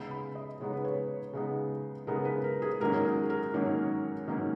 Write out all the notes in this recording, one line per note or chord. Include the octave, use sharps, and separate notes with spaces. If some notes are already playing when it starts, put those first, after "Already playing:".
Already playing: C#3 G#3 B3 D#4 B5
B5
D#5
C#3 G#3 B3 D#4 C#5
B4
C#5
C#3 G#3 B3 D#4
C#3 G#3 B3 D#4 A#4
B4
A#4
G#4
G#2 D#3 F#3 A#3 C#4 A#4
A#4
G#4
A#4
G#2 D#3 F#3 A#3 C#4 C#5
G#2 D#3 F#3 A#3 C#4